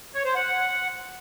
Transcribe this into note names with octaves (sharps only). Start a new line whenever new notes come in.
C#5
C5
F#5